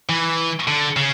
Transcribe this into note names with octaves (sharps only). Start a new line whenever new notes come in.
E3
D3
C#3